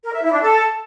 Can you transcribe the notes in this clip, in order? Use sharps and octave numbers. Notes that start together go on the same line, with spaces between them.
A#4
E5
E4
D4
A4